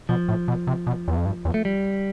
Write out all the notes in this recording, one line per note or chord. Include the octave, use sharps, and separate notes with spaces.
B2 F3
A2
B2
C3
B2
E2
F2
G2
E2
A3
G3